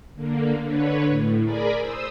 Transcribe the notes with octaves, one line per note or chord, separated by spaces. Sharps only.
D3 A#3
D3 B4 C#5
A2
G#4 A#4 D5 G#5 A#5 B5
C5 D#6 E6